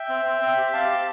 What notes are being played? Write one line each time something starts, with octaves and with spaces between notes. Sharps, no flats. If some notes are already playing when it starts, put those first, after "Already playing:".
Already playing: E5 G5
C4
C4
C4
G4
C4 F5 A5
G4